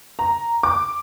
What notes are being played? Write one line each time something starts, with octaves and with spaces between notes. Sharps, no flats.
A#5
D6